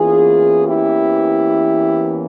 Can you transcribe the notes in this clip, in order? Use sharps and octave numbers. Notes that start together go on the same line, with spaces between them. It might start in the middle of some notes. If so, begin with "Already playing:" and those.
Already playing: E2 E3 A#3 C#4 F4 G#4
E4 G4